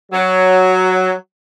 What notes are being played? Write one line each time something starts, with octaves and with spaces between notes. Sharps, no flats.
F#3